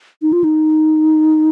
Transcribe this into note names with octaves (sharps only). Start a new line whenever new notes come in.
D#4
F4
D#4